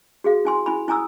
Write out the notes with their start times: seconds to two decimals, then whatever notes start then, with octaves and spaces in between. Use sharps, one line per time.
0.24 F#4 G#4 F5
0.45 E4 G#5 C6
0.66 E4 G#5 B5
0.88 E4 G#5 A#5 D#6 E6